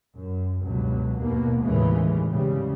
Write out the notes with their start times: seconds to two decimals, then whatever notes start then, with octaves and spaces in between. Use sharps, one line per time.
0.15 F#2
0.63 G1 C#2 B2 F#3
1.20 D#2 B2 A#3 B3
1.60 D#2 A2 C#3 E3 G#3
2.31 G#2 C#3 G3